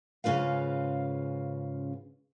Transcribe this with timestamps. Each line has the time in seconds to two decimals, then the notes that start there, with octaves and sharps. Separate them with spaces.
0.24 G#2 C#3 C#4 F4 B4 F5